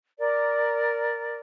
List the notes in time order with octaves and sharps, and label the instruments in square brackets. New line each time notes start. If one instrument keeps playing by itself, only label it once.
[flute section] A#4 D5